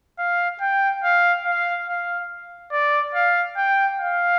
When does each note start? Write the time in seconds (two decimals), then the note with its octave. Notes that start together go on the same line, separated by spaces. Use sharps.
0.19 F5
0.61 G5
1.04 F5
1.46 F5
1.88 F5
2.72 D5
3.15 F5
3.57 G5
3.99 F5